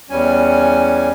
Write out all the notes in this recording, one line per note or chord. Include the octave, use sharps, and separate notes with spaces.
E2 G3 C#4 G#5